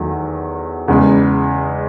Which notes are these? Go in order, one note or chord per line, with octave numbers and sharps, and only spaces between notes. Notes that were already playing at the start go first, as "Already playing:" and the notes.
Already playing: E2 D#3 F#3 A3
E2 C#3 G#3